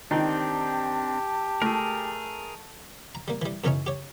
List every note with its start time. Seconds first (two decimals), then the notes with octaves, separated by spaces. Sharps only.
0.11 D#3 C4 D4 D#4 G4 A5
1.62 A3 G#4 A#4
3.15 A#5
3.28 G3 A#3
3.42 E3 G3
3.64 F#2 C#3 E3 C#4 D#4 C#5
3.86 G4 C#5